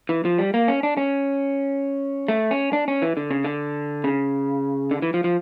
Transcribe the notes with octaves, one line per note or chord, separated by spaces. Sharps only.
E3
F3
G3
A#3
C#4
D4
C#4
A3
C#4
D4
C#4
E3
D3
C#3
D3
C#3
D3
E3
F3
F3